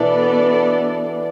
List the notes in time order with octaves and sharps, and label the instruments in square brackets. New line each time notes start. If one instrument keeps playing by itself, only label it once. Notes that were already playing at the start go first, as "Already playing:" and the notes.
Already playing: [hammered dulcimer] B2 E3 [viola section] B3 D4 A4 D5